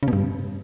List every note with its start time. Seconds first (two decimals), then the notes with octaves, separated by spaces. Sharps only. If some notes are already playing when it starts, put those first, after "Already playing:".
0.03 C#3
0.08 B2
0.13 G2